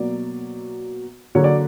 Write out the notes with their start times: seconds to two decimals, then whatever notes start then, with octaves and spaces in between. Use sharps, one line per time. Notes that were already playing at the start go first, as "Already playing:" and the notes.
Already playing: B2 F#3 A#3 D5
1.35 D3 F#3 A#3 C#5
1.44 D5